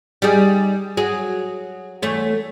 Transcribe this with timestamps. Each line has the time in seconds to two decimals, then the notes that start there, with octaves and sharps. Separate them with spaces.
0.22 G3 D#4 G#4
0.97 F#3 G#4
2.02 E2 A3 C#5